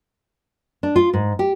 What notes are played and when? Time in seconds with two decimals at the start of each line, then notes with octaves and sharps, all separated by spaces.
0.83 D4
0.96 F4
1.13 G#2
1.39 G4